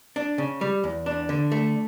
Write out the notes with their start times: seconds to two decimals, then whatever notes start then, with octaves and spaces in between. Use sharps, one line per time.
0.16 D4
0.38 C#3
0.61 G3
0.84 E2
1.06 D4
1.29 D3
1.52 A3